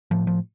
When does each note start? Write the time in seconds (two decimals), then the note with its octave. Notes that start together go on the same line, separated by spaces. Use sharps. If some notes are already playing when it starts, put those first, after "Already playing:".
0.11 A2 F3
0.27 F3